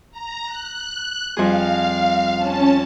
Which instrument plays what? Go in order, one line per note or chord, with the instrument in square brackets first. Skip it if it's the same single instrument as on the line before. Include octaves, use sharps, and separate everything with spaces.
[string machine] A#5
F#6
[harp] F2 G3 G#4 [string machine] F5
[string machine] C#4 A5